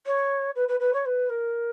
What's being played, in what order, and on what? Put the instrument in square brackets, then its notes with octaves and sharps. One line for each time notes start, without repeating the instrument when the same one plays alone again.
[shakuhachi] C#5
B4
B4
B4
C#5
B4
A#4